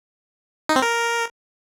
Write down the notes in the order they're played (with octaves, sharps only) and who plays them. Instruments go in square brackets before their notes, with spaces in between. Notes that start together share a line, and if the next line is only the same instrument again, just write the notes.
[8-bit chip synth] D#4
C4
A#4